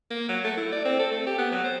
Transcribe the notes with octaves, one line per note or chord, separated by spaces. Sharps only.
A#3
F#3
A3
E4
D5
C4
A4
A3
G4
B3
F#3
C5